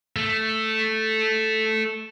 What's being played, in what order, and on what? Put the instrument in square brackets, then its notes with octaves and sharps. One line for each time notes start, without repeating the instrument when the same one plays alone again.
[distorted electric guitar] A3